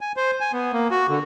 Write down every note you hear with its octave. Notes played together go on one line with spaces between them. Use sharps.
G#5
C5
G#5
B3
A#3
F#4
D3